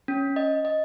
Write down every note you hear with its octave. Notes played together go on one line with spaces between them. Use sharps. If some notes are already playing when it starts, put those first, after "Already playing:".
C#4
D#5
D#5